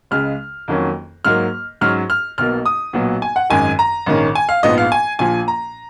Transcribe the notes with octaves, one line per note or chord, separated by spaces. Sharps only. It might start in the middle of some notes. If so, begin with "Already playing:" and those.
C#2 C#3 G#3 F6
F2 D#3 F#3 A#3 C#4
G#2 F#3 A#3 F6
G#2 F#3 C#4 F6
F6
B1 B2 A#3 F6
D#6
B1 A#2 F#3 B3
G#5
F#5
G#1 F#2 D#3 G#3 G#5
A#5
A#1 G#2 D#3 A#3 C#4
G#5
F5
A#1 G#2 F3 B3 D#5
F5
G#5
A#1 A#2 F3 G#5
A#5